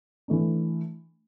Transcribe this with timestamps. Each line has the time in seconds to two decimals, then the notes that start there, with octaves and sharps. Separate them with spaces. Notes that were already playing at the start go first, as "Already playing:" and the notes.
0.28 E3 A3 D4